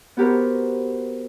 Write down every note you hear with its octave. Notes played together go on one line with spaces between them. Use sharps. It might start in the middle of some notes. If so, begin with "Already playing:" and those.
B3 F#4 G4 A#4 C5